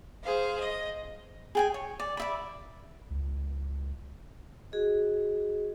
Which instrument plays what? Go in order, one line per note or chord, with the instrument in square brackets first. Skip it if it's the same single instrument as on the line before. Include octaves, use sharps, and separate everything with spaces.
[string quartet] G#4 C5 F5
D#5
[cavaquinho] G#4 G5 G#5
C#5
D5
D5 E5 B5
[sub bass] C#2
[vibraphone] F#4 G#4 D#5